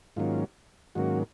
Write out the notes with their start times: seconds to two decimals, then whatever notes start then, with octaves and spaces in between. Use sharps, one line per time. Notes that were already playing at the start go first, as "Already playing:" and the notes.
0.17 G#2 D#3 F#3 A#3 C#4 F4
0.95 G#2 D#3 F#3 A#3 C#4 F#4